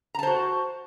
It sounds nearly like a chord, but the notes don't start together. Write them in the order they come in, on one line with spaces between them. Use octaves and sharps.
A#5 A5 C5 F#4